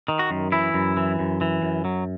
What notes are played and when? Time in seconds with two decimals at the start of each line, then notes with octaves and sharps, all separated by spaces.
0.08 D#3
0.19 F#4
0.31 F#2
0.52 E3 E4
0.74 F#2
0.97 E3
1.19 F#2
1.41 E3
1.63 F#2
1.85 F#3